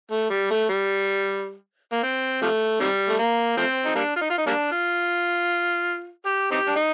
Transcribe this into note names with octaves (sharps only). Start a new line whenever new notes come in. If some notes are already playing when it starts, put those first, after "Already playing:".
A3
G3
A3
G3
A#3
C4
C3 F3 A3
C3 D#3 G3
A3
A#3
F3 A3 C4
D#4
G3 A#3 D4
F4
D#4
F4
D#4
G3 A#3 D4
F4
G4
C4 D#4 G4
D4
D#4